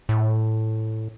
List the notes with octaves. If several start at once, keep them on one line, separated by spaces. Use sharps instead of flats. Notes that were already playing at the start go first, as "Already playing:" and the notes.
A2